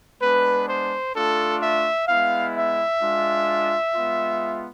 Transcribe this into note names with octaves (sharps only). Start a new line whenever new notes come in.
G#3 B3 D4 B4
C5
A3 D4 F4 A4
E5
G#3 B3 E4 F5
E5
G#3 D4 F4
G#3 B3 F4